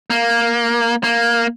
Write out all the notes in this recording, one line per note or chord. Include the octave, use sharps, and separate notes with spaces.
A#3
A#3